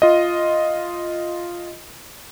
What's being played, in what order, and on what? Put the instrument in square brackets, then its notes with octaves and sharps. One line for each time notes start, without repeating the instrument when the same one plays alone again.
[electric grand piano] F4 D#5